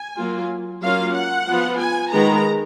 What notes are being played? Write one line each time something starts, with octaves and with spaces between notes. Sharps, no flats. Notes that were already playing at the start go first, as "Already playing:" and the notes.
Already playing: G#5
F#3 A#3 F4
F#3 A#3 C#4 F4 F5
F#5
F3 B3 F4
G#5
D#3 G#3 B3 A#5